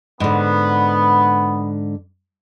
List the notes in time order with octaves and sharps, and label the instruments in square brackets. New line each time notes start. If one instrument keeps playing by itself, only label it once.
[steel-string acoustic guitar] G#2 D3 [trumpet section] B3